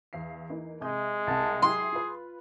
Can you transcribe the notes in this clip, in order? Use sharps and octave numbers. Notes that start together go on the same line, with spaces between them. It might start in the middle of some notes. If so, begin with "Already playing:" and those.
E2 F5 C7
E3 A#3 D#4
C3 G#3 D#6 G6
C2 C4 F#5 A5
F#3 E4 G4 G#4 C6
F4 B4